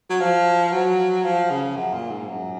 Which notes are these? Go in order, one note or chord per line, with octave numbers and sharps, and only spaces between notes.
F#3
F3
F#3
F3
C#3
F#2
A#2
G#2
F#2